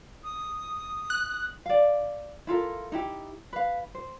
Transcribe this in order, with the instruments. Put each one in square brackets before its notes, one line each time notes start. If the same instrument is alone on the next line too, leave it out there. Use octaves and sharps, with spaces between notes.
[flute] D#6
[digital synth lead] F#6
[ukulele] D5 F5
E4 F4 A4 A#4
D#4 E4 G4
B4 F5
C5